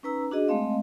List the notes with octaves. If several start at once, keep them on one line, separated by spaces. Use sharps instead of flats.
C#4 D#4 B4 A#5 E6
D4 F#4 G#4 D#5
G#3 A3 C4 D#5 F5